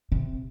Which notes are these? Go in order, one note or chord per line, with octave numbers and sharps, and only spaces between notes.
C3